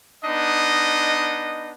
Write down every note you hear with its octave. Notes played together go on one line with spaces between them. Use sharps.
B3 D4 D#4 D#5